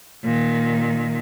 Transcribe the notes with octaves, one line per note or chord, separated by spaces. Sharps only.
A#2 D#3